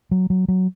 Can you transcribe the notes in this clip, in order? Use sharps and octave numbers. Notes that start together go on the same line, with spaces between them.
F#3
F#3
F#3